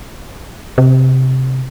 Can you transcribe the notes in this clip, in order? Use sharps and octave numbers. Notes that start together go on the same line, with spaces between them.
C3